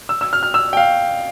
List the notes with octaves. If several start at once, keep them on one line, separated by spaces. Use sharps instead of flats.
E6
E6
F6
F6
E6
G5
F5